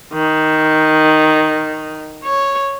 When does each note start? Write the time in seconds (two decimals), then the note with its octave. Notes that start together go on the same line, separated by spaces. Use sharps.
0.13 D#3
2.24 C#5